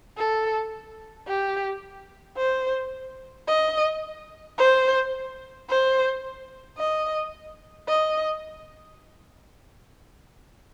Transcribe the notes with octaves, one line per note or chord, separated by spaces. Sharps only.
A4
G4
C5
D#5
C5
C5
D#5
D#5